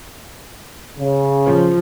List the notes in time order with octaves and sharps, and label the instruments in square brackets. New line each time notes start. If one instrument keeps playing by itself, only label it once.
[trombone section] C#3
[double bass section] F3